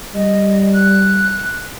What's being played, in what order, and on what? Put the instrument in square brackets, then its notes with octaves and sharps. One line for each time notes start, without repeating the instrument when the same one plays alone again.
[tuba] G3 [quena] D#5
[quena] F#6